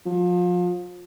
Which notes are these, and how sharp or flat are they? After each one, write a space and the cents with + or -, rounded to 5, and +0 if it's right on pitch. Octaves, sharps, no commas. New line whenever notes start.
F3 +30